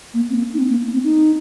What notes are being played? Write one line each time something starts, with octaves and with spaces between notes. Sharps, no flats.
A#3
C4
A#3
D#4
C4
A#3
C4
D#4